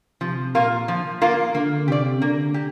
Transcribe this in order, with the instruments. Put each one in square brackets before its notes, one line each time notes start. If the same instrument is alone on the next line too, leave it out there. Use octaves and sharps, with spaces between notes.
[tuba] C3 [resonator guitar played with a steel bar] F3
[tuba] A#2 [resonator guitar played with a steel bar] A#3 F4 A#4
[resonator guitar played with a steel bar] F3
A#3 F4 A#4
[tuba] D3 [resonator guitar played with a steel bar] A#3
[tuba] C3 [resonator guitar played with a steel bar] G4 D5
[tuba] D3 [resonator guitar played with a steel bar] A#3
[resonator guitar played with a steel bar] G4